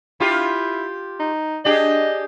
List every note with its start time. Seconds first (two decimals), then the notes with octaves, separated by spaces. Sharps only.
0.20 E4 F4 G4
1.19 D#4
1.65 D4 G4 G#4 D#5